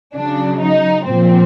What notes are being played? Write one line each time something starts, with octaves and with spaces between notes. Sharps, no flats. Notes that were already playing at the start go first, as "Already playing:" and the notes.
C#3 F#3 D4
D#4
A#2 F3 C4